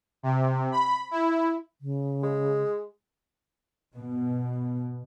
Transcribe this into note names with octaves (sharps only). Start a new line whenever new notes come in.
C3
B5
E4
C#3
G#3
B2